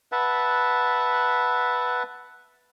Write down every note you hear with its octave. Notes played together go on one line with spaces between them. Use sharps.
B4 E5 F#5 A5